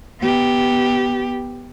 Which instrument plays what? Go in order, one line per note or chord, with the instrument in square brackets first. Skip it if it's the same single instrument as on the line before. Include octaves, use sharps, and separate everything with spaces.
[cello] B3 G4